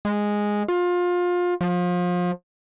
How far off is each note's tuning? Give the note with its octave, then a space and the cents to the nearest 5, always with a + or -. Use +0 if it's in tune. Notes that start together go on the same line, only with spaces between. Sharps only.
G#3 -5
F4 +25
F3 +30